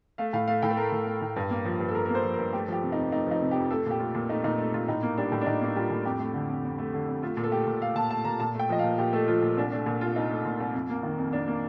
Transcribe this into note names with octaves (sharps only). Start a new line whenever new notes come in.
A3 F5
A2 F5
A3 F5
A2 G5
A4
A3 A#4
A2
A3
A2
G2
A#3
F3
G2
A4
G2 A#4
A#3 A#4
C5
F3
A#4
G2
A3 G4
F3 G4
C3
D#4
F2
A3 D#4
F3 D#4
C3
G4
F2
A3 A4
A#2 G4
A3 F4
A#2
A3 D#4
A#2 D#4
A3
A#2 F4
A2 D#4
A#3
G3 D4
A2
D4
A2 D#4
A#3 D#4
G3 F4
A2
F2 G4
A3
D3
F2
F2
A3
D3
F2
A3 F4
A#2
A4
A3 G4
A#2
A3 F5
A#2 A5
A3 A5
A#2 A#5
A#2 A5
A3 G5
F3 D#5
F5
A#2
A#2 G4
A3 A4
F3 F4
A#2
C2 D4
A3 D4
A#2
C2 F4
C2 D#4
A3
A#2
C2
F2
A#3
D#3
F2
F2 D4
A#3